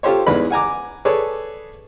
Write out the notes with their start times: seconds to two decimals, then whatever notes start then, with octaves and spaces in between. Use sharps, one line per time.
0.03 F4 G4 A4 C5 C#5
0.27 E2 G#2 E3 G#3 B4 B5
0.50 F#5 G#5 A#5 D6
1.05 G#4 A4 B4 C#5 D5